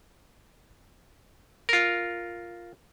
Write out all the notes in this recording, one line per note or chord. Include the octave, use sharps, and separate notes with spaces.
F4 A#4